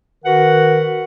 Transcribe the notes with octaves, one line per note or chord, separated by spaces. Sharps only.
D#3 F#4 A#4 B4 F#5